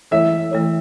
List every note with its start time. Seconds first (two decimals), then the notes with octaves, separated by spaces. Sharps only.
0.11 E3 A3 E4 A4 C#5 E5
0.51 E3 A3 E4 A4 C#5